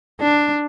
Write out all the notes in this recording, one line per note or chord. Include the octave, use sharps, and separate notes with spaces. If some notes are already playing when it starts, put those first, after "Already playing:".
D4